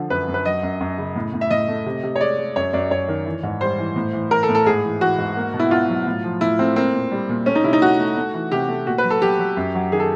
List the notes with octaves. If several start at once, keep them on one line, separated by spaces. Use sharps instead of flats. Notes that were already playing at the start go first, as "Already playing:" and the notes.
Already playing: D3 F3
F#2 B4
F#2
B4
F#3 D#5
F#2
F#2
C#3
A2
A2
E5
A2 D#5
A3
C3
C3
C#5
G#3 D5
G#3
F#2 C#5
F#2 D5
F#2 C#5
D#3
E3
G#2
G3 C5
E3
A2
E3
E3 A#4
A4
A2
A4
G#2 G#4
E3
E3 F#4
G#2
A#3
B2
E4
B2 F4
F#3
A2
F3
A2 E4
A3 C4
A#3 C4
A#2
G3
A#2
A3 C#4
D#4
C3 E4
D#4
A3 F#4
A3
A3
E3
C3 G4
A3
A#2 F#4
B4
F#3
A4
F#3 G4
F#3
F#2
F#3
D#3 G#4
A4